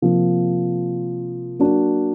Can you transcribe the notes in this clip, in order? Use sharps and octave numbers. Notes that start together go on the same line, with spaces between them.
C3 F3 A#3
F#3 A#3 D4 F#4